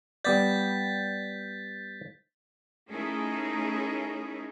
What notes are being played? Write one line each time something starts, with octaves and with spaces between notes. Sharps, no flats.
G3 B3 D5 G6 A6 B6
A3 C#4 D#4 E4 G#4 A#4